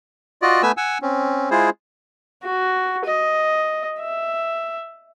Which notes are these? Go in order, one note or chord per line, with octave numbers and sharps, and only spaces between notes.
F4 F#4 D5 D#5
A3 B3 B4 G#5 E6
F#5 G#5 E6
C4 C#4
G#3 E4 F4 G#4 C5
F#4
D#5
E5